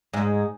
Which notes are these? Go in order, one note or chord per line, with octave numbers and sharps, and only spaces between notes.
G#2